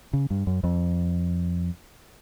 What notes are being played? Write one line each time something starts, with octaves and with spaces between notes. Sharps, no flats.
C#3
G2
F#2
F2